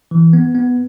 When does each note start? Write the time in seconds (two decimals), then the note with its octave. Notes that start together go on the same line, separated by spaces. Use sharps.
0.11 E3
0.33 B3
0.55 B3